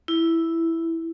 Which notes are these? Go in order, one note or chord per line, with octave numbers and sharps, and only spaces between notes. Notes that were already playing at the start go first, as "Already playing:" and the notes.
E4